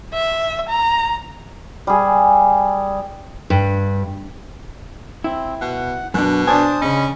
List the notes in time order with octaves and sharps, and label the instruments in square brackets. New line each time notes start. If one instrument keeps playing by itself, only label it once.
[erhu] E5
A#5
[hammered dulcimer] G3 G#4
[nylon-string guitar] G2
[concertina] C4 [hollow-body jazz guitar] E4
[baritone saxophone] B2 [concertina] F#5
[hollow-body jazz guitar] F#2 D4 [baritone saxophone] B2 [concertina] F#6
[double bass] D4 [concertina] C5 A5 D#6 [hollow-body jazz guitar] G#5
[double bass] C#3 [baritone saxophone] C#4 [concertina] D#5 B5